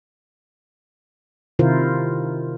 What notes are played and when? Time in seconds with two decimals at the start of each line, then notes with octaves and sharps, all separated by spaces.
1.59 C3 D#3 E4 F4 A#4 C5